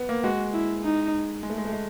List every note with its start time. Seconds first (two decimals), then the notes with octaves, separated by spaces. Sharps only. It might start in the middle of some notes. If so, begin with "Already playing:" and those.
Already playing: B3
0.09 A#3
0.24 G#3 F#4
0.54 E4
0.83 D#4
1.43 G#3
1.50 A3
1.58 G#3
1.65 A3
1.73 G#3